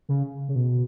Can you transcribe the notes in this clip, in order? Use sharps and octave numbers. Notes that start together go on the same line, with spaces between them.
C#3
C#3
B2